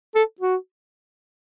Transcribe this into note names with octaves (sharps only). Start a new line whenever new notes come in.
A4
F#4